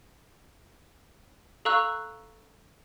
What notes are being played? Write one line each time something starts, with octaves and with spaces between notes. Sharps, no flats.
A4 F5 A#5 C#6 E6 F#6